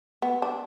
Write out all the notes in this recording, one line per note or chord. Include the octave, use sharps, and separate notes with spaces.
B3
D4